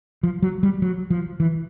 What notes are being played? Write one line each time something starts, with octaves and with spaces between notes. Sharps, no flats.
F3
F#3
G3
F#3
F3
E3